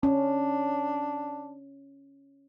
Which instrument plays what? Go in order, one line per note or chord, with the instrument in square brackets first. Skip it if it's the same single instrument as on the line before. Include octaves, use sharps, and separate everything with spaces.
[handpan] C#4 [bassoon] D4